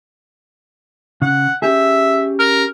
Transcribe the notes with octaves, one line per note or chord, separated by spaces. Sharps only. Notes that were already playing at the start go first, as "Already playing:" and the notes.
C#3 F#5
C#4 G4 G#4 E5
A#4